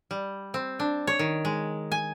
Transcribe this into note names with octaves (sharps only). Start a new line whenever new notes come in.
G3
C4
D4
C#5
D#3
G#3
G#5